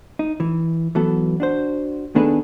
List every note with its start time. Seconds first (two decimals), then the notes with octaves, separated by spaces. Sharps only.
0.19 D#4
0.40 E3
0.95 E3 F#3 B3 A4
1.40 D4 F#4 C5
2.15 D#3 B3 D4 G#4 A4 B4